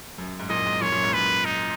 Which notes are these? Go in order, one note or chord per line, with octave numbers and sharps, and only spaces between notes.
F#2
G#2
F#2 A#2 D#5
G#2
F#2 A#2 C#5
F#2 A#2
G#2
F#2 B4
D#4